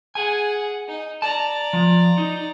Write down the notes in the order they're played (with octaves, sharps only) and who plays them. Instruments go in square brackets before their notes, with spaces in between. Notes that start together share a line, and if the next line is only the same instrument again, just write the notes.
[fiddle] G#4 F#5 [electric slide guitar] G#5
[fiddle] D#4
[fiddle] D5 A#5 [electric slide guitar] A5
[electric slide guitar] F3
D#4